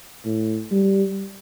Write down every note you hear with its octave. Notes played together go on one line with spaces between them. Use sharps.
A2
G3